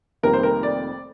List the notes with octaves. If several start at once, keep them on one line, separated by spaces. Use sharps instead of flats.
F1 F2 D#3 G3 A#3 A#4
C5
A#4
D5